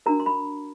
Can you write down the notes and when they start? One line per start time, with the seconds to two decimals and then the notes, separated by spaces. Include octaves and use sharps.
0.06 D4 F#4 A#4 A#5
0.20 C6
0.26 B5